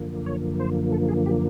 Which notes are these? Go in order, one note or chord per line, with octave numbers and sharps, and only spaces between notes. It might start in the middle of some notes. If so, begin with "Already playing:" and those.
Already playing: F#2 D3 F3 A#3
C#5
C5
A4
G#4
G4